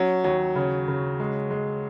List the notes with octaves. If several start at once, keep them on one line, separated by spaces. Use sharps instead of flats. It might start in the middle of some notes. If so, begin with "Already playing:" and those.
Already playing: F#3 C#4
D#2 F#3
C#3
C#3
G#3
G#3